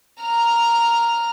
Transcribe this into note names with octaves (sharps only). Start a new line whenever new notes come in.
A#5 F6